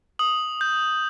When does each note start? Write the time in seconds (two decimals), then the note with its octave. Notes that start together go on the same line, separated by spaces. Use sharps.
0.19 D#6 F#7
0.61 G6